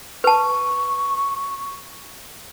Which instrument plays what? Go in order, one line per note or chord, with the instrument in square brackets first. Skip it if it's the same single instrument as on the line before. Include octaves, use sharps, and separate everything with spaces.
[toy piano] B4 A5 [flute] C#6